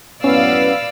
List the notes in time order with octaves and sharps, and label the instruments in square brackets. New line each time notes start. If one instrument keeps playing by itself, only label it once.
[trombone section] F#2 A2 B3 [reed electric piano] C#4 [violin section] B4 F5 E6 [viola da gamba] D5